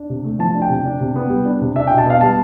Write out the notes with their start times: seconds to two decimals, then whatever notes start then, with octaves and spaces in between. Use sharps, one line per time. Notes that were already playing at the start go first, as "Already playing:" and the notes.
Already playing: D4
0.10 C3
0.24 A3
0.39 F3 A5
0.55 D4
0.62 G5
0.70 C3
0.85 D4
1.01 C3
1.16 B3
1.30 G3
1.45 D4
1.61 C3
1.76 D4 E5
1.87 G5
1.91 B2
1.98 A5
2.06 B3 F5
2.21 G3 A5